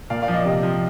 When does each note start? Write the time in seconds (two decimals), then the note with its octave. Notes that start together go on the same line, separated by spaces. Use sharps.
0.10 A#2 D5 F5
0.22 D5 F5
0.28 F3
0.34 D#5
0.45 C3 D#5
0.63 F3